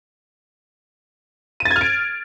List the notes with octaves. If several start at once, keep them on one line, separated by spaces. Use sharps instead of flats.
D#7
A6
G#6
F6
D7